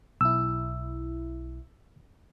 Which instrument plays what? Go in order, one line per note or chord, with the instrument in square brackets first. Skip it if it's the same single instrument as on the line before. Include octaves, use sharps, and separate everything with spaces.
[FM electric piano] B1 E4 [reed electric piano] E6